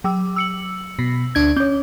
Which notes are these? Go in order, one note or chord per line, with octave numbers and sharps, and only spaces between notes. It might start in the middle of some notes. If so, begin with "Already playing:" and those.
F#3 D6 E6
E6 C#7 F#7
B2
D2 D4 G#6
C#4 C#5 G6